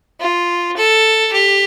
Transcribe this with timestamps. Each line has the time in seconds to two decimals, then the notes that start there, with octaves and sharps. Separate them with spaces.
0.21 F4
0.77 A4
1.33 G4